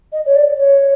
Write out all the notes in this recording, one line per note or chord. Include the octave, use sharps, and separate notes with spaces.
D#5
C#5
D5
C#5